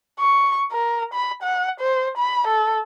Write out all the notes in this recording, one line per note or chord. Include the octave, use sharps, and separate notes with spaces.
C#6
A#4
B5
F#5
C5
B5
A4